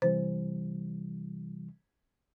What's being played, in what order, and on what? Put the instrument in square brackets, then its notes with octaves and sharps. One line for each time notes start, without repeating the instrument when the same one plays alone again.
[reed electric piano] C3 E3 G3 [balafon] C5